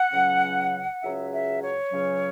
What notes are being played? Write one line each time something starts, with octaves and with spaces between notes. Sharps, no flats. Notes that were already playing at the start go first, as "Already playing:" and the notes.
Already playing: F#5
C#2 C#3 F#3 C#4
C#2 C#3 F#3 C#4 E5
E5
C#5
C#2 C#3 F#3 C#4